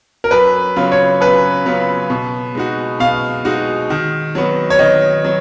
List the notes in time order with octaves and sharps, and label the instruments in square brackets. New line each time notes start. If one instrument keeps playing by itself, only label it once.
[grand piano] A#4
[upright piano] F#2 [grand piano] B4
[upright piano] C#3 F#3 B3 F4
[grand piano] C#5
[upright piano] F#2 [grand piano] B4
[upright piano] C#3 F#3 B3 F4
B2
G#3 D#4 F#4
[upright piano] B2 [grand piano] F5
[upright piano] G#3 D#4 F#4
D#3
F#3 B3
[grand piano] C#5
[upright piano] D#3 [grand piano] D#5
[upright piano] F#3